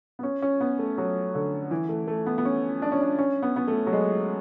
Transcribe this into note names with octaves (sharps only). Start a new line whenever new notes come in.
B3
C#4
C#4
B3
A3
F#3
D3
E3
A3
A3
B3
B3
C#4
D4
C#4
D4
C#4
B3
B3
A3
F#3
G#3